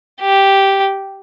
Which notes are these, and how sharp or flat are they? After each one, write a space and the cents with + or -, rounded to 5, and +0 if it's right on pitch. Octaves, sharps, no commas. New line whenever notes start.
G4 -5